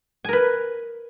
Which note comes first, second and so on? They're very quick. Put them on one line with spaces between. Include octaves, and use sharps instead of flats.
G#5 A#4 B4